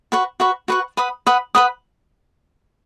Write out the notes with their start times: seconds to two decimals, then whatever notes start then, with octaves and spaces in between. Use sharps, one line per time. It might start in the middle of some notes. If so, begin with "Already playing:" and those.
0.12 F#4 B4 F#5 C#6
0.40 F#4 B4 F#5 C#6
0.68 F#4 B4 F#5 C#6
0.97 B4 F#5 B5 D#6
1.26 B4 F#5 B5 D#6
1.55 B4 F#5 B5 D#6